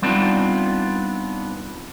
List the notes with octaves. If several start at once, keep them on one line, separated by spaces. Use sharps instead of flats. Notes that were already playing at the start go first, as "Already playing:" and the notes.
G3 B3 C4 D4 D#4 F4